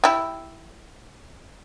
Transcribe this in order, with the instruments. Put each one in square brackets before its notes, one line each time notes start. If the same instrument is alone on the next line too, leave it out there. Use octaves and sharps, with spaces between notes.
[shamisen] E4 G4